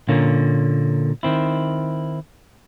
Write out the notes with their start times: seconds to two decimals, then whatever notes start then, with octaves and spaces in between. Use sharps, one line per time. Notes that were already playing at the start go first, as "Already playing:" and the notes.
0.08 A#2 D3 A#3 C#4
1.23 D#3 C4 E4